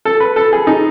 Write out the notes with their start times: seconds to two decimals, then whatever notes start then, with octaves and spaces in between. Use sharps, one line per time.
0.05 A4
0.20 B4
0.36 A4
0.53 G#4
0.67 D#4